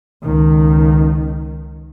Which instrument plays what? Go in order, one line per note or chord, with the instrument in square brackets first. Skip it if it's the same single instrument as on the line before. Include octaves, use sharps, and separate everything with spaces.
[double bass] C#2 D#3